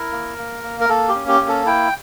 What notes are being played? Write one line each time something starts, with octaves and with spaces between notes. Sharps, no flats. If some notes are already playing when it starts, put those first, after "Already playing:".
Already playing: E4 A#4
A#3
A#3
A#3
A#4
A#3 A4
G4
C#4
G4
A#3
A4
E4 G5